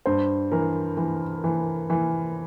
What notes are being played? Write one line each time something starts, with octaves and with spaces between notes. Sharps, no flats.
G2 C5
E3 A#4
E3
E3
E3